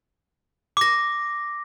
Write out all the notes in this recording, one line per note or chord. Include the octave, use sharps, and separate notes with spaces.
D6 A#6